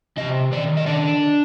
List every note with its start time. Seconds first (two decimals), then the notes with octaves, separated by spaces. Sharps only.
0.17 C3 D#5
0.52 D#3 D5
0.77 D#5
0.86 D4 D5